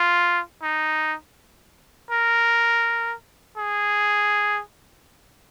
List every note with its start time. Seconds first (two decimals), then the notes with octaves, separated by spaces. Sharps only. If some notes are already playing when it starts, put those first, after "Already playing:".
Already playing: F4
0.62 D#4
2.11 A#4
3.57 G#4